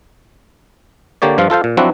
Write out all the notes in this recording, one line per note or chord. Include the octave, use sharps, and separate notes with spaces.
D3 A#3 G4 C#5 D5
G2 F3 F4
F4 A4 C5 F5
A#2
F3 F#3 C4 D4 E4 F#4